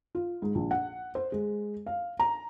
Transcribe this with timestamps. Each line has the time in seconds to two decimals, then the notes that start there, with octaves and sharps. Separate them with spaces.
0.15 F4
0.42 G#2
0.55 A#1
0.71 F#5
1.15 C5
1.32 G#3
1.86 F5
2.19 A#5